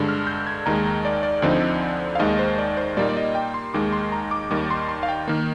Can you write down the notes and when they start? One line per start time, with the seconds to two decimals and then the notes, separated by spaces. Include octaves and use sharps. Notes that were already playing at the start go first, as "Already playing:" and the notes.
Already playing: G2 D3 G#3
0.08 F6
0.27 G6
0.47 G#6
0.66 D#2 D#3 G#3 A#5
0.86 A#5
1.05 D5
1.23 D5
1.42 D2 D3 F3 C4 D#4
2.15 F5
2.19 D#2 D#3 G#3 D#5
2.39 C5
2.58 D5
2.77 C5
2.97 A#2 G3 A#3 D#4 D5
3.09 D5
3.17 D#5
3.35 G5
3.54 C6
3.74 D#2 D#3 G#3 D6
3.92 C6
4.12 A#5
4.31 D6
4.51 D#2 D#3 G3 D6
4.71 C6
4.89 C6
5.03 F5
5.09 G5
5.27 D#3 A#3